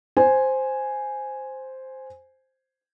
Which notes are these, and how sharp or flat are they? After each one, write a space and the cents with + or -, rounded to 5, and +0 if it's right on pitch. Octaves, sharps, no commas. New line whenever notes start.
C5 +0 G#5 +0